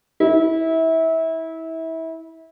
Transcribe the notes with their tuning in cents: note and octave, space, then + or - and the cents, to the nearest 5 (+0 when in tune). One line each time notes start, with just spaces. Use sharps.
E4 -25